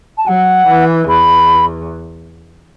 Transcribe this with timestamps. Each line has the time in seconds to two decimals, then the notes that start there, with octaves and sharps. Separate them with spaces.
0.17 A5
0.27 F#3 F#5
0.67 E3
1.08 E2 B5